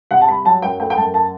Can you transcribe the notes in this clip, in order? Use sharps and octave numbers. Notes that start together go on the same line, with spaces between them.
C3 F#5
A5
G3 B5
F#3 A5
F#2 G5
A3 G5
G5
F#2 A5
A5